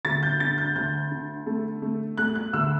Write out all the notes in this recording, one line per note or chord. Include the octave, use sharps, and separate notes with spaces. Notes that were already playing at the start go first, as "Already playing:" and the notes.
D2 A6
G6
D3 A6
G6
D2 G6
D3
A3
A3
A3 F#6
F#6
D2 E6